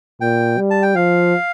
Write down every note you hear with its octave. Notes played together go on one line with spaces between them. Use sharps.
A#2 G5
G3
A5
G5
F3 F5